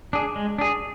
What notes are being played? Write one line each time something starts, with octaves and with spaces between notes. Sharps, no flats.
D4 G#4
G#3
D4 G#4